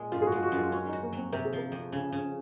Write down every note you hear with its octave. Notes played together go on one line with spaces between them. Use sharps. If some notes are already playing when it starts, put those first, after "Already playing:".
Already playing: A#2 G#3
F#2 F4
G#4
F#4
G#3 F4
F#4
F#2
F4
C#4 F#4
D#4
F#4
A#3
F#3 C4
C3 A#4
G#4
F3 A#4
F2
C#3
C#3